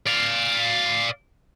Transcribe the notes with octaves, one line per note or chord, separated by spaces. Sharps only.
D5 F5